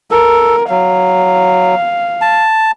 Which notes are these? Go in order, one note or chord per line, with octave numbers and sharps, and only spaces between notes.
A4 A#4
F#3 F5
A5